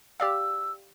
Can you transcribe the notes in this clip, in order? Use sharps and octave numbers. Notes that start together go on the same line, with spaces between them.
G4 D5 F5 E6